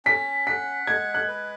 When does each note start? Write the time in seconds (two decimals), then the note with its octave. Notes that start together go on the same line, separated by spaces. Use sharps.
0.06 C#4 B6
0.47 F#5 B6
0.87 G#3 G#6
1.15 F#6
1.28 B4